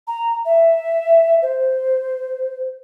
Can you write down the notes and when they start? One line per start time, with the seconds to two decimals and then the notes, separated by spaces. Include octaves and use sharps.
0.07 A#5
0.45 E5
1.42 C5